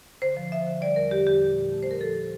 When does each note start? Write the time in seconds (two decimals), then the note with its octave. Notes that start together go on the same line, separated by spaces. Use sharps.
0.22 D3 C5
0.37 F3
0.52 F3 E5
0.67 D3
0.81 G3 D5
0.96 E2 A#4
1.11 D3 G4
1.27 E2 G4
1.41 A#2
1.56 A#2
1.71 A3
1.83 A#2 C5
1.91 A#4
2.00 F3 A4